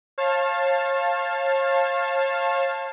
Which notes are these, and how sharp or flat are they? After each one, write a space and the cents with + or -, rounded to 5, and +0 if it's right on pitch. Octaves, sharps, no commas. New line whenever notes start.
C#5 -40 F5 +0 A5 +0